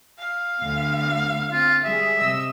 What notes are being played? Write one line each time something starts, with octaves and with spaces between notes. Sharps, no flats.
F5
D2 B3
C4 F4
G3 G#4 E5
C3 D#5 E6